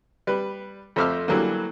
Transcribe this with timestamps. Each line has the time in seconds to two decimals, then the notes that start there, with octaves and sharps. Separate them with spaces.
0.27 G3 B4
0.96 F2 A3 C5 E5 D6 F6
1.28 D3 E3 F#3 G3 A3 A#3